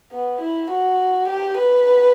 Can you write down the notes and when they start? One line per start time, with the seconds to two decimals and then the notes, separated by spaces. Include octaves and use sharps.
0.12 B3
0.41 E4
0.70 F#4
1.28 G4
1.57 B4